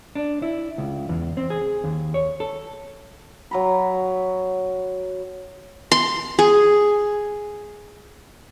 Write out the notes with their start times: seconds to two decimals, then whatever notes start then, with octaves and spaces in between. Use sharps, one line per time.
0.15 D4
0.42 E4
0.78 C#2
1.09 E2
1.37 C4
1.50 G#4
1.84 D#2
2.14 C#5
2.40 A4
3.51 F#3 A#5 B5
5.92 C6
6.39 G#4